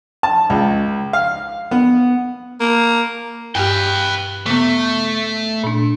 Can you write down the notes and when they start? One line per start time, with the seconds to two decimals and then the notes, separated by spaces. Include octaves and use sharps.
0.23 A5
0.50 C#2
1.13 F5
1.71 B3
2.60 A#3
3.55 G2 G4 B4 G5
4.46 C#3 A3 B3
5.64 A#2 D4